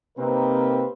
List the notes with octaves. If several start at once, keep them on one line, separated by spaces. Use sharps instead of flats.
C3 A#3 C4 D#4 A#4 B4